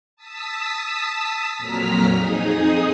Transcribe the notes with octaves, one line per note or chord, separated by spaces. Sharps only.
A5 D#6 E6 B6
F2 A#2 F#3 A#5 F6 B6
F2 D#4 G#4 D#6